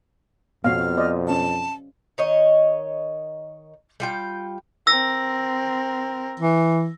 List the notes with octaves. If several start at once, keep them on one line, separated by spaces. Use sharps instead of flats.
F2 B2 F#4 C#5 F5 F6
C5 D5 D#5
C#4 F5 A5
D#3 C#5 D#5
G3 F4 G5
C4 A#4 E6 A#6
E3